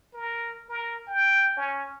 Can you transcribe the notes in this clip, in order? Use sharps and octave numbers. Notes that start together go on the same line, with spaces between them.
A#4
A#4
G5
C#4